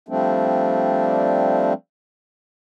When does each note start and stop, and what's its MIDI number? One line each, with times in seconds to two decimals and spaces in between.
0.09 1.73 53
0.09 1.73 55
0.09 1.73 57
0.09 1.73 60
0.09 1.73 62